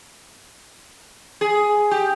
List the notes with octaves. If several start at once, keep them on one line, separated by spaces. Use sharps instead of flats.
G#4
G4